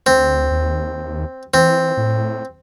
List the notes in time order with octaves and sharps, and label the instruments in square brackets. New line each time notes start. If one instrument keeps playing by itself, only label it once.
[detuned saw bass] D2 [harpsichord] C4
[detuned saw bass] D#2
[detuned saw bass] E3 [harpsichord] C4
[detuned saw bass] A2